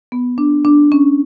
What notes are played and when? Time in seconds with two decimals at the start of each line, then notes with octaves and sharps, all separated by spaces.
0.12 B3
0.38 D4
0.65 D4
0.92 C#4